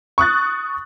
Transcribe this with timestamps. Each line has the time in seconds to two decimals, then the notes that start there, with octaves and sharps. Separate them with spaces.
0.18 C#6 D#6 F#6 A6